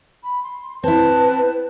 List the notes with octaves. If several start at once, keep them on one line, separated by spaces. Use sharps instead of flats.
B5
C6
C4 E4 B4 A5